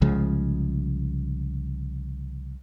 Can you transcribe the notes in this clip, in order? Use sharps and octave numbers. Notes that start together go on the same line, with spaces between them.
C2 C#3 F3 G#3